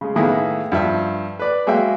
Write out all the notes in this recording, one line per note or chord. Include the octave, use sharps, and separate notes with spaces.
C#3 G#3
A2 D#3 A#3 B3 E4 G#4
G2 F3 E5
B4 D5
F#3 G#3 A#3 G#4 E5 G5